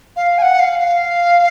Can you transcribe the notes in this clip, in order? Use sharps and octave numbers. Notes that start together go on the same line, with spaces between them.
F5
G#5
F#5
F5
F5